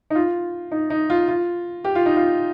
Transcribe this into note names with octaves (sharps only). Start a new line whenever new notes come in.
D#4
F4
D#4
D#4
F4
F4
G4
F4
D#4
F4